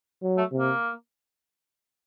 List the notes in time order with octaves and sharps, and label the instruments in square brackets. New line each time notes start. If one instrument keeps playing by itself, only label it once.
[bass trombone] F#3
[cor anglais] A3
[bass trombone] C3
[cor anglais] A#3